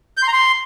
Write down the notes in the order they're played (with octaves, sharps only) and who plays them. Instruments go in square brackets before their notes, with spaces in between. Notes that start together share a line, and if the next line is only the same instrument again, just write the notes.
[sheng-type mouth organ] G6
C6
A#5
C6